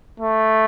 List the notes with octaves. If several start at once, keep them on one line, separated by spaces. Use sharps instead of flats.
A3